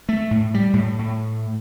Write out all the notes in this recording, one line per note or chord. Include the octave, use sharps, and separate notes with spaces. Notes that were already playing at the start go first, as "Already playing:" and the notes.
A3
A2
G3
A2
A2